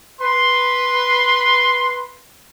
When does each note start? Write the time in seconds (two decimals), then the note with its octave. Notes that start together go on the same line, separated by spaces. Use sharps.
0.20 B4 C6